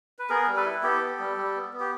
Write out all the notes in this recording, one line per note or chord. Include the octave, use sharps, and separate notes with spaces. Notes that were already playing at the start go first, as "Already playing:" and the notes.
B4
B3 G#4 A#4
G3
A4 B4
E4
B3 G4 A4
B3
G3
G3
B3
B3
G4